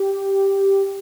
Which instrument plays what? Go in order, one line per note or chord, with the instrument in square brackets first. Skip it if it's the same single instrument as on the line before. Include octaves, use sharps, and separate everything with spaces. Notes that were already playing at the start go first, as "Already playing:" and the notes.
Already playing: [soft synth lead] G4